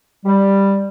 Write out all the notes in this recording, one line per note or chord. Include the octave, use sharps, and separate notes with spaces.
G3